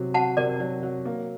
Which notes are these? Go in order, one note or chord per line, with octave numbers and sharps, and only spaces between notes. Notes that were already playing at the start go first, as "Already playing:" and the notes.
Already playing: C3 F#3
F#4 F#5 A5
C3 A#4 D5
F#3
F#3
A#3